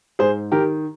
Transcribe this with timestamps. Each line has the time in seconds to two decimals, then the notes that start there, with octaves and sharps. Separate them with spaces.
0.19 G#2 G#4 C5
0.52 D#3 G4 A#4